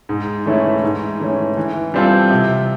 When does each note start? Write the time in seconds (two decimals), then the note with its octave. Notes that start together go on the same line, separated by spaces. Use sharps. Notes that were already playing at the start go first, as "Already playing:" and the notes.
0.09 G#2
0.46 E3 A3 C#4 E4
0.83 G#2
1.20 E3 A3 C#4
1.57 E3
1.94 G3 C4 F4 A4
2.30 C3